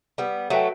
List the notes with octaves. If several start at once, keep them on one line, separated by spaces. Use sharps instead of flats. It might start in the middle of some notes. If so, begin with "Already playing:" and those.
G3 B3
F#3 A3 F#4 B4 E5 G5